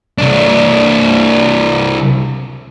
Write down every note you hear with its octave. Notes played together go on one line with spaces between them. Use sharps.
C2 D4